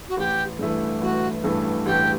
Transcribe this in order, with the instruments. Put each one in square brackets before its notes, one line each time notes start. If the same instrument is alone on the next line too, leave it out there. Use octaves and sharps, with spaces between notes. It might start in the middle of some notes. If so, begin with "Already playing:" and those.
[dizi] F#4
[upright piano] A1 [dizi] G4
[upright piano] G2 E3 A3
[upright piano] A1 [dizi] F#4
[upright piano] G2 E3 A3
[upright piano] A1 [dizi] G4